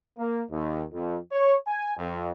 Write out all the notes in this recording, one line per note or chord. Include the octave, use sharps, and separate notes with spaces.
A#3
D#2
F2
C#5
G#5
F2